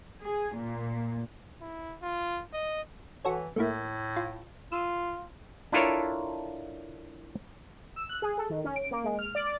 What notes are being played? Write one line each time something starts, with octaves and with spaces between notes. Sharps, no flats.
G#4
A#2
E4
F4
D#5
E3 F#4 A4 C#5
A2 A3 A#3 E4
F4
F4 E6 D#7
D4 E4 F4 A4 A#4 C#5
E6
F#6
G#4
A4
D#3
C#4
D7
A#3
G#3
F6
D5